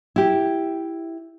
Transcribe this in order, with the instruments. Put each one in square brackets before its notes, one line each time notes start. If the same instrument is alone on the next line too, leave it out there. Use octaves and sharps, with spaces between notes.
[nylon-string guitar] E4 G4